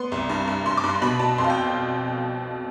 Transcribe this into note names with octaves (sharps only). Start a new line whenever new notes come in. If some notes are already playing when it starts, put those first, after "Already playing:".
Already playing: B3 C6
C2
G2
G2
G2 C6
D6
G2
C6
B2 B5
B2 A5
F2 C6
F5
G5